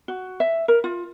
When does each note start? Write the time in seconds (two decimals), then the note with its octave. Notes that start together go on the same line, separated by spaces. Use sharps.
0.08 F#4
0.40 E5
0.68 A#4
0.84 F4